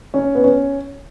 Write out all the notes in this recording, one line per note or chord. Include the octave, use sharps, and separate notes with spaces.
C#4
B3
C#4